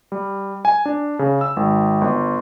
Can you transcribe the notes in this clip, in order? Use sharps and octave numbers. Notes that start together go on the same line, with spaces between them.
G3
G#5
D4
C#3
E6
G#1
G1